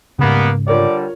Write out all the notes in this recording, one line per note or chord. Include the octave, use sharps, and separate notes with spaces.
G#2 C#3 G3 A#3 B3
D3 G3 F4 A#4 C#5 D5